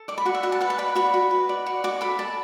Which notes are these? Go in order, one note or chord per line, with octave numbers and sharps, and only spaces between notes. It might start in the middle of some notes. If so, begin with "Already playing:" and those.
Already playing: A4
D5 D6
B5
F#4 F#5
E5
F#4 F#5
A5
B4 F#5
A5
D5 B5
F#4 B5
F#4
B4
D5
F#4
F#4 D6
A4 B5
D5 A5